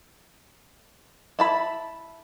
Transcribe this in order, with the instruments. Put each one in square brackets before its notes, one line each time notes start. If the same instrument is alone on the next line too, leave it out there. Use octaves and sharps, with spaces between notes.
[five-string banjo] E4 A5 B5